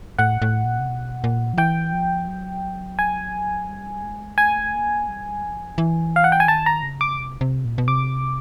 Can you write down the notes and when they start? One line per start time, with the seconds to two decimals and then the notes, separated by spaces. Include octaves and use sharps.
0.18 A2 F#5
0.42 A2
0.64 A#2
0.79 C3
0.89 B2
1.24 A#2
1.53 F3
1.58 E3 G5
1.93 F3
2.28 F#3
2.99 G#5
3.69 G3
4.04 G#3
4.38 A3 G#5
4.74 A#3
5.08 G3
5.43 F3
5.78 E3
6.16 F5
6.24 F#5
6.32 G5
6.40 G#5
6.48 D#3 A5
6.66 A#5
6.83 C#3
7.01 D6
7.18 C3
7.41 C3
7.65 A#2
7.78 B2
7.88 C3 D6